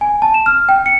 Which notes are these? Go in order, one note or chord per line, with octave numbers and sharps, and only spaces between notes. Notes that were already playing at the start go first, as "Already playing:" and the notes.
G#5
A5
E7
F6
G5
C#7